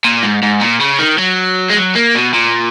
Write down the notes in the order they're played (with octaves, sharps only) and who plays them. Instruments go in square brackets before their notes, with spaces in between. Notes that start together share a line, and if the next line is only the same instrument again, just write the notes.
[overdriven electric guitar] A#2
G#2
G#2
A#2
C#3
D#3
F#3
G#3
F#3
A#3
B2
A#2